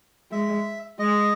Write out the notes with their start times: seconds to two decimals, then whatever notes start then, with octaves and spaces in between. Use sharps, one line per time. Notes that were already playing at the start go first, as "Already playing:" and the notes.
0.32 G#3 E5
0.99 G#3 D#5